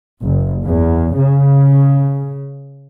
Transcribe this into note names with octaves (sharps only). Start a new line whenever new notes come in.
F#1
E2
C#3